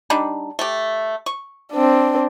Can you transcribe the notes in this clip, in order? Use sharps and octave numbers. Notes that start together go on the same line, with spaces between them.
G3 D4 D#4
A3 G4
C#6
C4 D4